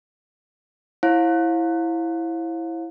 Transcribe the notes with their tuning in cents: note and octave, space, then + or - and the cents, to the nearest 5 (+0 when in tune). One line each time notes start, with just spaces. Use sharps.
E4 +0 C#5 -45 F5 +30